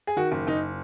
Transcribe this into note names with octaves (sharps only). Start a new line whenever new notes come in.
G#4
D#3 F#4
F#1
F#1 D#4